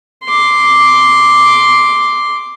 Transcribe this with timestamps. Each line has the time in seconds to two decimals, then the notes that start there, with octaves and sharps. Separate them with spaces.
0.24 C6 D6